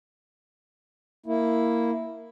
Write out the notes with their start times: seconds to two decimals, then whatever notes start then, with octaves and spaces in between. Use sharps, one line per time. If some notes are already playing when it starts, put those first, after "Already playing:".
1.26 A#3 E4